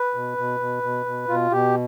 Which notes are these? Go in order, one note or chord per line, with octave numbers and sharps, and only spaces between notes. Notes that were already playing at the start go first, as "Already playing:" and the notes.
Already playing: B4
B2
B2
B2
B2
B2
B2 F4
B2 G4